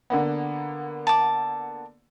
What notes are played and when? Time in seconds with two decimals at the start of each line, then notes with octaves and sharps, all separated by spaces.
0.10 D3 A#3 B3
1.07 A5 D6